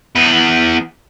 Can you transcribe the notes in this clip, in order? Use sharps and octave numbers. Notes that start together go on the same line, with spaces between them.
E2 B4